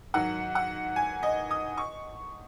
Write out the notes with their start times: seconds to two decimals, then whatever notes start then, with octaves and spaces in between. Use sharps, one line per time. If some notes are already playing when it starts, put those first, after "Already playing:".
0.14 G#2 D#3 F#3 F#5
0.55 F#5
0.96 G#5
1.23 D#5
1.51 D#6
1.77 C#6